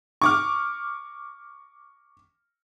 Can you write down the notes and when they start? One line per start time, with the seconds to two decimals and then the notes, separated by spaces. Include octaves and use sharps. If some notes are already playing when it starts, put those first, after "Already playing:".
0.21 C#6 D6 F6